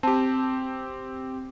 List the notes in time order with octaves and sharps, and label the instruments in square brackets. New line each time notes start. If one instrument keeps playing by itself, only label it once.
[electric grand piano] C4 G4 [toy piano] A5